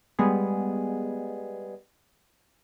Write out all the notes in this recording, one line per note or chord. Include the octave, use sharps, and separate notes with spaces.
G3 G#3 B3 G#4